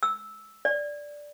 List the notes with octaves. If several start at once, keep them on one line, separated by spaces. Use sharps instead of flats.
E6
D5